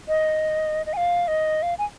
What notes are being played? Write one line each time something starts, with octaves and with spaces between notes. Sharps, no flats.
D#5
D#5
G#5
F5
D#5
F5
G#5